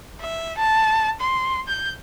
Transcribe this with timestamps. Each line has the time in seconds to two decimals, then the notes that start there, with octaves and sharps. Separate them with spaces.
0.21 E5
0.58 A5
1.20 C6
1.68 G6